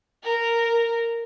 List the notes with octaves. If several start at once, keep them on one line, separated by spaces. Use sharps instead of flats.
A#4